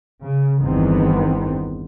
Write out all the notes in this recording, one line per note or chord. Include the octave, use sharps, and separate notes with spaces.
C#3
G1 E2 D#3 B3 C4